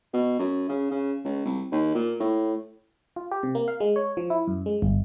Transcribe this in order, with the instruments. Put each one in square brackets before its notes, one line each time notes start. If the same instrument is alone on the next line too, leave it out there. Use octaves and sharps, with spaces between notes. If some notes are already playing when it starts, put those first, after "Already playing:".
[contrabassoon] B2
F#2
C#3
C#3
C#2
C2
D#2
A#2
A2
[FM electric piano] F4
G4
C3
A#3
F5
G#3
C#5
F3
E4
F#2
G#3
G1